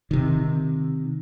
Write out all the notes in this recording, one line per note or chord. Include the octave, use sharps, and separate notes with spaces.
C3 D#3